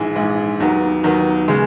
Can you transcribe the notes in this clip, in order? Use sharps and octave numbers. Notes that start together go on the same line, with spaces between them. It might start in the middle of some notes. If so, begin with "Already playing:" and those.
Already playing: A#1 G#2 E3 G#3
A#1 G#2 E3 G#3
D#2 D#3 F#3 B3
D#2 D#3 F#3 B3
C#3 G#3